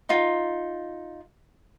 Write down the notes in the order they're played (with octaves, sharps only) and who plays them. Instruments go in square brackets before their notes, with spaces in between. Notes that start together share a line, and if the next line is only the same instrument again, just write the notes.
[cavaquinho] D#4 F4